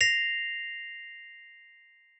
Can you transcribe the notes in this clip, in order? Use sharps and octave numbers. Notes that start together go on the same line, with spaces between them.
A#6 C7 F7